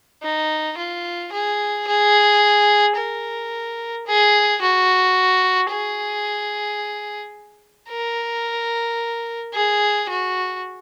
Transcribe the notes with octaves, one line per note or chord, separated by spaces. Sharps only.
D#4
F4
G#4
G#4
A#4
G#4
F#4
G#4
A#4
G#4
F#4